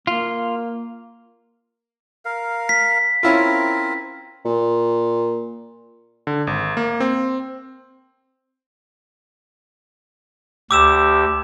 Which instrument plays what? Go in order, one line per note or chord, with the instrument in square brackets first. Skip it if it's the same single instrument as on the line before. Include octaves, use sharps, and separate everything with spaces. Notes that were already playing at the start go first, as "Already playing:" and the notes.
[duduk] A#3 [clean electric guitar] F4
[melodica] A#4 F5
[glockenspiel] B6
[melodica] C4 A#4 [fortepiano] C#4 E4 F4
[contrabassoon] A#2
[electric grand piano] D3
G#1
A#3
C4
[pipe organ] D2 G4 [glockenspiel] D6 E6 E7